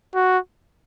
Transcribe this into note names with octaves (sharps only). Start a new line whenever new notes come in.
F#4